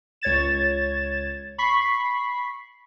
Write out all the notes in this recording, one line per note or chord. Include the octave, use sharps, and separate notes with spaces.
C#2 C#5 G#6 A6 E7
B5 C#6 B6 C7